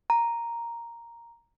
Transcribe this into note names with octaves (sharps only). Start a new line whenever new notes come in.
A#5